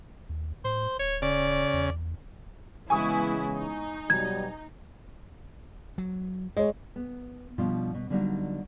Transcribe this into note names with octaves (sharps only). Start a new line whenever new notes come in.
D#2
A2 C5
D1 C#5
C#3 D5
E2
C#3 E3 G#3 B3 E4 G#5 C#6 D#6
D#4
B2 F#3 G3 G#6
F#3
G#3 C#5 D#5
B3
B2 F3 G3 D4 F4
B2
D3 F#3 G3 A#3 D#4 F#4